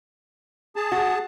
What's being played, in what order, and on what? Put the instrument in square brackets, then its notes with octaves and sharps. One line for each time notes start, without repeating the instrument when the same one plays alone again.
[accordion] G#4 A5
[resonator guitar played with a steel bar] F#4